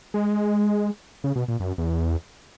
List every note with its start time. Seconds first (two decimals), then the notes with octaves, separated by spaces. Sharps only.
0.14 G#3
1.24 C#3
1.36 B2
1.48 A#2
1.60 F#2
1.78 E2